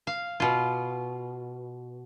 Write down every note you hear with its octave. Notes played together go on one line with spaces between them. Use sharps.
F5
B2 F4